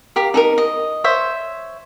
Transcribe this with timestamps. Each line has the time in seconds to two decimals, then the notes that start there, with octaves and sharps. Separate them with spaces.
0.16 G4 A#4 F5
0.34 D#4 A4 A#4
0.58 D#5
1.04 C5 C#5 E5